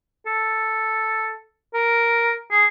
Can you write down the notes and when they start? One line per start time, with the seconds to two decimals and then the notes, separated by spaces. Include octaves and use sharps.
0.26 A4
1.74 A#4
2.51 G#4